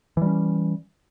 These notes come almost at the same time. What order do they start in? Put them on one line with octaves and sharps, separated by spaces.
E3 G3 C#4